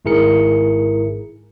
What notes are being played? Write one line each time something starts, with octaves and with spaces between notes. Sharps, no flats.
G#1 G#2 E4 G#4 A#4 C#7